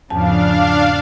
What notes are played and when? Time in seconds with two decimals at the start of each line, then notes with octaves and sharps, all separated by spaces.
0.10 E2 G#2 C#3 F3 B3 D4 F5 A5